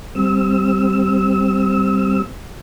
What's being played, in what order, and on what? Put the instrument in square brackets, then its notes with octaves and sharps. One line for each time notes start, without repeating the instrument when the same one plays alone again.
[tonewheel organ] G3 C4 E6